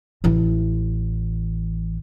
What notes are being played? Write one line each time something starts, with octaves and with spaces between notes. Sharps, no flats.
A1 E3